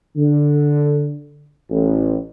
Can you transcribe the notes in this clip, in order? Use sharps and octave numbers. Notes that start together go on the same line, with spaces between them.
D3
A1